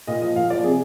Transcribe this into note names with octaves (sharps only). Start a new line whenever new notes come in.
A#2 D#5
F3 D#5
A#2 F5
F3 D5
C3 G#4